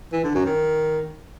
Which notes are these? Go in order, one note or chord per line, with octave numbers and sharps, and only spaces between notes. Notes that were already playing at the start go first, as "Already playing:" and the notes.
E3
D3
F#2
D#3